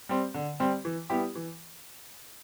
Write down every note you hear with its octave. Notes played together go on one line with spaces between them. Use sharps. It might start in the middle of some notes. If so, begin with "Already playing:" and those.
G3 C4
D3
G3 C4
E3
G3 B3 E4 G4
E3